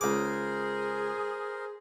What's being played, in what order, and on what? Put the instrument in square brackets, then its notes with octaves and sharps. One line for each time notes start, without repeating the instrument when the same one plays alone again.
[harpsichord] C#2 D6 [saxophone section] G#4 [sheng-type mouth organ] A#4 C5